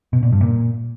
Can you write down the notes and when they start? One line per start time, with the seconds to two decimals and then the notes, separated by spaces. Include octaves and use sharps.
0.13 B2
0.23 A#2
0.32 G2
0.42 A#2